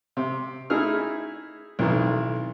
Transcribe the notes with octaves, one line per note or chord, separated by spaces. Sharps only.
C3
A3 D#4 E4 G#4 F6
B1 F2 D#3 E3